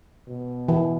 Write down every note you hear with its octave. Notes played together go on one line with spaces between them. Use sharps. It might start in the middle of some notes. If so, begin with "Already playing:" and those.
B2
E3